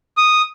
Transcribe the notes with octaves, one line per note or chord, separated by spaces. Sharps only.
D#6